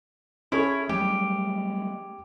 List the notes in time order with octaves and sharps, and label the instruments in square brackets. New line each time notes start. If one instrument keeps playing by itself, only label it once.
[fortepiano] C#4 G#4 A4 [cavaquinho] E4 C#5
[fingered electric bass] F#3 G3 A3 [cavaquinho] G4